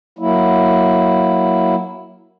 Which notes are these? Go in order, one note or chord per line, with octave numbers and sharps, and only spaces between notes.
F#3 A#3 E4